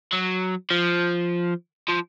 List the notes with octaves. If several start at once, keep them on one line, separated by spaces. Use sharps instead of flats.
F#3
F3
F3